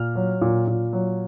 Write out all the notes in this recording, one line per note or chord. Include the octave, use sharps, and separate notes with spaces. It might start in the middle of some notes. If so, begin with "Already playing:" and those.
Already playing: A#2 F6
F#3
A#2
A#2
F#3